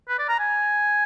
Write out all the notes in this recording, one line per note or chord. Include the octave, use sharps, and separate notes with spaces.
B4
D5
A#5
G#5